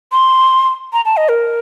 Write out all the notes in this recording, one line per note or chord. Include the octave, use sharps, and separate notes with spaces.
C6
A#5
A5
D#5
A#4